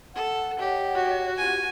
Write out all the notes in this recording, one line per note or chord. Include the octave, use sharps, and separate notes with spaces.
A4 F#5
G4 C#5 D#5
F#4
C#4 F4 G4 G#5